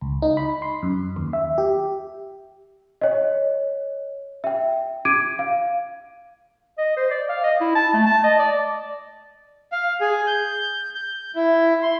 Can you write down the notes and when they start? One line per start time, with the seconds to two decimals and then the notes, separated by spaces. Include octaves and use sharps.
0.01 C#2
0.22 D#4
0.37 B5
0.62 C6
0.83 F#2
1.16 D#2
1.33 E5
1.58 G4
3.01 C#5 D#5
4.44 E5 G5
5.05 D6 G#6 D7 D#7
5.39 F5
6.78 D#5
6.97 C5
7.11 D5
7.29 F5
7.44 D#5
7.61 E4
7.75 A5
7.94 A3
8.06 A5
8.24 D#5
8.39 D5
9.72 F5
10.01 G#4
10.27 G6
10.95 G6
11.36 E4
11.82 C6